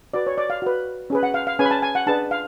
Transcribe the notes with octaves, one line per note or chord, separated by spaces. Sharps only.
F#4 B4 D5
C#5
D5
F5
F#4 B4
C#4 G#4 B4
F#5
F5
F5
C#4 G#4 B4 G#5
B5
A5
G#5
F#5
D4 G#4 B4 A5
F5